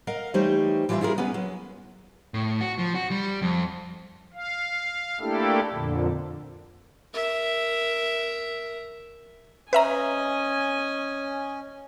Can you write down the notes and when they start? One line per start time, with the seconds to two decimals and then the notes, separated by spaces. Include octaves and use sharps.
0.07 A#4 D#5 F5 F#5
0.34 E3 G3 A3 D#4 C5 C#5
0.89 E3 G3 F4 C5 E5 F5
1.01 E4 F4 G#4 A#4
1.18 B3 C#4 B4
1.34 F#3
2.34 A2
2.61 F#4
2.78 F3
2.95 F#4
3.11 G3
3.42 F2
4.34 F5
5.20 A3 A#3 D4 E4 G4 A4
5.73 F2 A#2 D3
7.14 A#4 E5
9.73 C#4 B4 D#5 E5 G#5 A#5